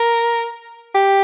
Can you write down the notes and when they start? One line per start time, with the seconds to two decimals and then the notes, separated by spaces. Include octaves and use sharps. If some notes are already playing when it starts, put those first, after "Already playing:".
Already playing: A#4
0.95 G4